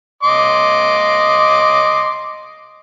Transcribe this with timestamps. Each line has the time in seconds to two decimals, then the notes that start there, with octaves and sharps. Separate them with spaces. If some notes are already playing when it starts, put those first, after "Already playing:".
0.23 D#5 C6 D6